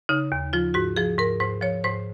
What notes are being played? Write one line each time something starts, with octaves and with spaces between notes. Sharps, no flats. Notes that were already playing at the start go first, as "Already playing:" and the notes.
C#3 D#4
D#2
F3 F4
G#2 F#4
F3 G#4
G#2 A#4
G#2 C5
F3 C#5
G#2 C5